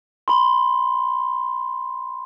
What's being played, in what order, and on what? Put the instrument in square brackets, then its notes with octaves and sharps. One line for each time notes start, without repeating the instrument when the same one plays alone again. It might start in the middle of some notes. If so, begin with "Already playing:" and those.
[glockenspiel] B5 C6